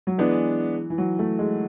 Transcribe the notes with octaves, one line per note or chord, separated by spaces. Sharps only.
F#3
E3 G#3 B3 D4 G#4
E3
F#3
A3
G#3